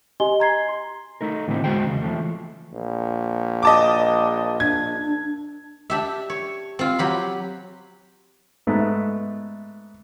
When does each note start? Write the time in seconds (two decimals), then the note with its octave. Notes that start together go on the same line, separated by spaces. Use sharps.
0.20 G4 D#5 G#5 C6 G7
0.40 A#5 G#6 C7
0.69 C6
1.21 A3 D#4 A#4
1.48 A2 D3 E3 A3 C4
1.64 E2 G#3 F#4 C5 G5
1.87 E2 C#3
2.02 E3 F3 A3
2.73 A#1
3.63 D#5 A5 D6
4.60 D4 G#6
5.90 D4 G4 E5
6.30 C#5
6.79 C4 F4
6.99 F#3 G4 B5
8.67 G#2 A3 B3